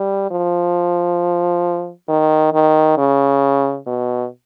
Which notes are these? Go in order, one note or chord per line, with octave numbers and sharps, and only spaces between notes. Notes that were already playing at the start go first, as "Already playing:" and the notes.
Already playing: G3
F3
D#3
D#3
C#3
B2